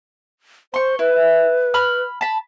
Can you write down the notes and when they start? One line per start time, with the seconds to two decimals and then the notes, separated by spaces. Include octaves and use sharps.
0.74 C5 C6 C#6
0.99 E4 B4
1.74 B5 F6
2.21 A5 B5